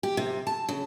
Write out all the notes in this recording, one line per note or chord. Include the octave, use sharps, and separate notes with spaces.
G4
C3
A5
C#3